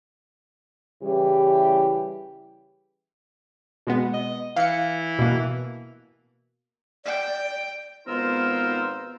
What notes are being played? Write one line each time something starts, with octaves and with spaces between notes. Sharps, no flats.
C#3 E3 G3 E4 G4
B2 G#3 B3
D#5
E3 F5 C#7
B2 A#3
D5 G5
G#1 B3 D#4 F4 A#4 C5 E6